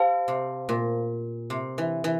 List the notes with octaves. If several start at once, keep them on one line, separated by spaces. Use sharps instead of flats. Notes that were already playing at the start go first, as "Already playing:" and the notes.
Already playing: G4 C5 F5 A5
C3
A#2
C3
E3
E3